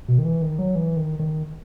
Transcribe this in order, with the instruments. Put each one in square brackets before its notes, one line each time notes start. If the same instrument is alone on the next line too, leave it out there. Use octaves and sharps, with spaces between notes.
[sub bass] B2
D#3
E3
D#3
F#3
E3
D#3
D#3